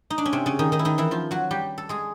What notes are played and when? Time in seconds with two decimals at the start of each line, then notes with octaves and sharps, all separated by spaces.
0.10 D#4
0.18 D4
0.26 C#4
0.33 C3 C4
0.46 C#3 C#4
0.59 D#3 D#4
0.72 D#3 D#4
0.79 E4
0.85 D#3 D#4
0.98 E3 E4
1.11 F3 F4
1.31 F#3 F#4
1.51 G3 G4
1.78 A4
1.89 G#3 G#4